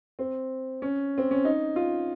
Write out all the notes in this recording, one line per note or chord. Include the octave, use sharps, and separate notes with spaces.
C4
C#4
C4
C#4
D#4
F4